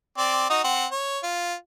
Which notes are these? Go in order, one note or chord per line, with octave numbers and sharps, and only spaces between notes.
C4 D5
D#4 F#4 D#6
C4 F#5
C#5
F4